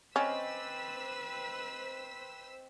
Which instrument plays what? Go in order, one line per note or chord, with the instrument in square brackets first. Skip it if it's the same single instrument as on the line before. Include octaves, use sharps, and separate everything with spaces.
[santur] C4 D5 D#5 [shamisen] C#4 [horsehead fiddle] B4 [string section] C5 E6 B6